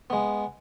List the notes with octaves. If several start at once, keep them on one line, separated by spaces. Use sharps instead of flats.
G#3 B3